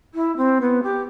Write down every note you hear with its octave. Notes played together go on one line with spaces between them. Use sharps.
E4
C4
B3
G4